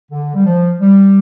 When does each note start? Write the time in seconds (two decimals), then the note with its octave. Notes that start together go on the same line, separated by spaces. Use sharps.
0.11 D3
0.35 G3
0.46 F3
0.80 G3